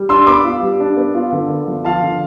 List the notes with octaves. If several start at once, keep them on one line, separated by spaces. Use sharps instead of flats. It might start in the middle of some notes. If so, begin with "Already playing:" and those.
Already playing: G3
D4 C6 E6
B3 B5 D6
F4
G3
D4
B3
F4
D3
B3
F3
F4 F5 A5
D3